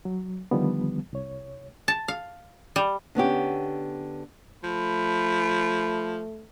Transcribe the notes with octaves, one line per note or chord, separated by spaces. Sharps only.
F#3
D3 D#3 F3 G3 B3
C2 C#5
A5
F5
G3
D3 B3 C#4 G4
F3 A3 B5